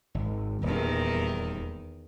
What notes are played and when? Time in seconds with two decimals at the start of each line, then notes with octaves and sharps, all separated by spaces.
0.14 G#1
0.63 D#1 E2 A#2 D#3